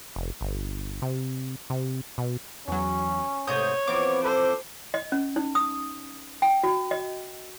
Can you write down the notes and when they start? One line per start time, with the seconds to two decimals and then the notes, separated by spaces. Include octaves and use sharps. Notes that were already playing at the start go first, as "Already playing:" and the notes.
0.16 F1
0.41 G1
1.02 C3
1.70 C3
2.18 B2
2.68 E2 F#3 C#4
3.47 G#2 C3 A3 C#5 D#6 G6
3.87 E3 F3 B3 C4 D6
4.23 A4 C5
4.94 D#5
5.12 C#4
5.36 D#4
5.55 D#6
6.42 G5
6.64 F#4
6.91 D#5